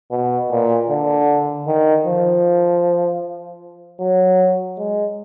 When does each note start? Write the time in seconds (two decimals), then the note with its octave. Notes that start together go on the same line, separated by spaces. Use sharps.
0.11 B2
0.51 A#2
0.89 D3
1.67 D#3
2.06 F3
4.00 F#3
4.77 G#3